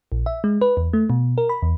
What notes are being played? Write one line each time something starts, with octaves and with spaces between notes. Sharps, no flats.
A#1
E5
G#3
B4
E2
A3
B2
A#4
B5
E2